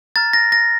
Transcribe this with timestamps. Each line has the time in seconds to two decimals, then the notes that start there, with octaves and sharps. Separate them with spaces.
0.16 A#5 F6 A6
0.33 A#6
0.52 A#6